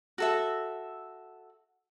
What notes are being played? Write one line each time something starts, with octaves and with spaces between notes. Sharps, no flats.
F#4 A4 E5